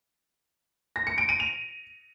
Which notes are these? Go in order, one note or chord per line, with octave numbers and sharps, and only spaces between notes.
A#6
C#7
D7
D#7
F7